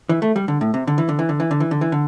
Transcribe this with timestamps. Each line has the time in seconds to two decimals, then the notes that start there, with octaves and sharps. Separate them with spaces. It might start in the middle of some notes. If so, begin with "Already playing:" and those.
0.09 E3
0.22 A3
0.36 G3
0.48 D3
0.61 A2
0.74 C3
0.87 D3
0.98 E3
1.09 D3
1.19 E3
1.29 D3
1.40 E3
1.51 D3
1.60 E3
1.71 D3
1.81 E3
1.92 D3